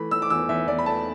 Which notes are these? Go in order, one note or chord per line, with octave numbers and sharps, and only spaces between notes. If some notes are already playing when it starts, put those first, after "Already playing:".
Already playing: E3 A3 B5
A3 E6
D6
E2 E6
E2 E5
E2 D5
B5
A3 A5